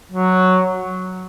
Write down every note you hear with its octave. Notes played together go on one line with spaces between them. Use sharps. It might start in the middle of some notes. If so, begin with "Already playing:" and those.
F#3